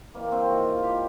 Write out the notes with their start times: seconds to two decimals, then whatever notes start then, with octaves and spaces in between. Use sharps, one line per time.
0.14 C3 E3 G3 A#3
0.32 C4
0.49 G#2 F3 F#4
0.67 F4
0.83 D#3 G3 G4